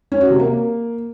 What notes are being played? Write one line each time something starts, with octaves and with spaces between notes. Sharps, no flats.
C#4
F#4
C3
A#3